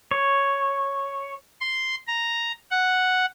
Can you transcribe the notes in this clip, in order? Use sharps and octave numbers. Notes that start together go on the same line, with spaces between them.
C#5
C6
A#5
F#5